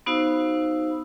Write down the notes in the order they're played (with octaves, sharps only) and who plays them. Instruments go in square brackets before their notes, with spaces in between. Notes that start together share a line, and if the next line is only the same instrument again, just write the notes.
[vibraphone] B3 D#4 F#4 C5 F5 E6